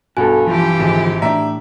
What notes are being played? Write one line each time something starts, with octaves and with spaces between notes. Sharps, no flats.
B1 G2 F#4 A4 G#5
E3 F3 G4
G#1 D2 F3 G#4
A2 D4 E5 A#5